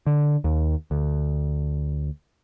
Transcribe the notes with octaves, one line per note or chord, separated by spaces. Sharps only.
D3
D#2
D2